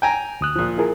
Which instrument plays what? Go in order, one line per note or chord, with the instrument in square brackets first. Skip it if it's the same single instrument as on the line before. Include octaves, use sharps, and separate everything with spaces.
[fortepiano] G5 G#5 A#5
[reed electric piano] D2 D#6 F#6
[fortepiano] A#2 F3
[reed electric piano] E4 G#4 A#4